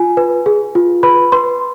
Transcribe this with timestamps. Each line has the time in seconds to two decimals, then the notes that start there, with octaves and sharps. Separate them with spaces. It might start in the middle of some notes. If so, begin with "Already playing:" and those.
Already playing: F4 G#5
0.17 B4
0.46 G#4
0.75 F4
1.03 B4 B5
1.32 B4 C6